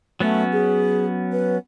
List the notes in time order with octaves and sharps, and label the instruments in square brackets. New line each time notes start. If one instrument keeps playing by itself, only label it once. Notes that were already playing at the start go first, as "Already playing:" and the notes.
[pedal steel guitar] F#3 B3 C#4 [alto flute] A3
[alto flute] G#4
B4